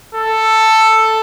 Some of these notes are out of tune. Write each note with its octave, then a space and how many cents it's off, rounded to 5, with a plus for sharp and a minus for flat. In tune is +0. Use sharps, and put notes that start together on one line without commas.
A4 +5